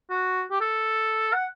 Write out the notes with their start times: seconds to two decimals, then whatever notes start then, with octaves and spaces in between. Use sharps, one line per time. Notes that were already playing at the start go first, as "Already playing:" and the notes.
0.10 F#4
0.51 G4
0.61 A4
1.33 F#5